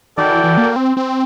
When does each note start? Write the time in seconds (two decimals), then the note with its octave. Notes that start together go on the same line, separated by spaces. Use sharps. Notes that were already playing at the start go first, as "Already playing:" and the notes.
0.17 D#3 F#4 A4 D5 G5
0.30 E3
0.44 E3
0.57 A#3
0.76 C4
0.97 C4